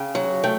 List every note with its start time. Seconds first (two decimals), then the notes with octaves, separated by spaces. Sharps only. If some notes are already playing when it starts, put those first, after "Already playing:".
Already playing: C#3 G5
0.15 F#3
0.44 A3 G5